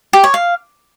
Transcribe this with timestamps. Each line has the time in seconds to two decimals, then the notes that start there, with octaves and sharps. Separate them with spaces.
0.13 G4
0.24 C#5
0.34 F5